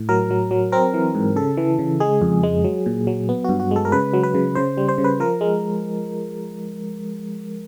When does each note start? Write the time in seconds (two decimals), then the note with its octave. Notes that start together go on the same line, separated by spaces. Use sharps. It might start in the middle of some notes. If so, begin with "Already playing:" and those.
Already playing: A2
0.09 F#3 A#4
0.30 F#3
0.51 F#3
0.72 C4 A#4
0.94 E3
1.15 G#2
1.36 C#3 A4
1.57 E3
1.79 C#3
2.00 G#3 G#4
2.22 F2
2.43 G#3
2.64 F#3
2.86 A#2
3.07 F#3
3.29 B3
3.44 G2 F#4
3.60 F#4
3.71 G#3 A4
3.85 A#4
3.92 C#3 B4
4.14 F#3
4.23 B4
4.34 C#3
4.55 C#3 C5
4.78 G3
4.89 C5
4.98 C#3
5.04 B4
5.20 F3 A#4
5.41 G#3